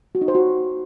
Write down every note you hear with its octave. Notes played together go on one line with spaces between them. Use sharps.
F#4
D#4
C5
F#4